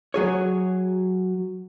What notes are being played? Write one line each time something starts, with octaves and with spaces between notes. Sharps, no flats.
F#3 G#4 C#5